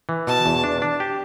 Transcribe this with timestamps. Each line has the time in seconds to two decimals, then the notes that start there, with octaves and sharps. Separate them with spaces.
0.09 E3
0.27 B2 A5
0.46 E2
0.64 D4
0.82 D4
1.00 G4